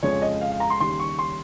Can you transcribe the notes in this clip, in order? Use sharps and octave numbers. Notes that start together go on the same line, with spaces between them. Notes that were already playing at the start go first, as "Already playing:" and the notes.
F2 C#3 F3 G#3 C#5
D#5
F5
F5
A#5
C6
D#2 C#3 G3 C6
C#6
C6